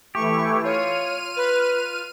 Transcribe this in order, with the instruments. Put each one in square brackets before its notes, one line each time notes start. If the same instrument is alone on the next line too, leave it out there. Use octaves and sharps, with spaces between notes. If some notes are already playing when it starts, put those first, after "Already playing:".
[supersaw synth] E3 A3 E4 [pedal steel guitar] G4 [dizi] C#6
[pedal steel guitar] F4 [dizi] C#5 [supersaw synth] F6 D#7
[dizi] B4